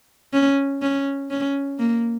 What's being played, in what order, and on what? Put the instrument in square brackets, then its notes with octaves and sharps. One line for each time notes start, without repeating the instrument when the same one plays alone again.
[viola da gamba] C#4
C#4
C#4
A#3